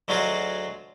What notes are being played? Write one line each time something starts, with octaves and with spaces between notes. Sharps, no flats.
D2 F#3 G#3 F4 F#4 G#4